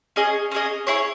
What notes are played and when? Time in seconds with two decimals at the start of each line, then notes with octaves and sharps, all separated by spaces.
0.16 C#4 G#4 D#5
0.51 C#4 G#4 D#5
0.87 E4 G#4 C#5